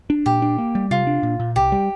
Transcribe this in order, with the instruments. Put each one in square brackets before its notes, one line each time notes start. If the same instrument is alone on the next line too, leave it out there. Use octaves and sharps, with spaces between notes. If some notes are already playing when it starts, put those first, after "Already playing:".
[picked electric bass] D4
[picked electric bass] A#2 [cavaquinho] G4
[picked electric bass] D4
A#3
G3
[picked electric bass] C3 [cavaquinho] F4
[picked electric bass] D4
A#2
A#2
[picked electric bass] C2 [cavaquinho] G4
[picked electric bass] G3